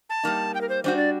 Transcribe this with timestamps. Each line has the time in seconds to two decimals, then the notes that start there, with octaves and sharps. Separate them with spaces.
0.10 A5
0.23 G3 A#3 D#4
0.54 G5
0.61 A#4
0.69 C5
0.84 G3 D4 F#4 C5
0.97 D5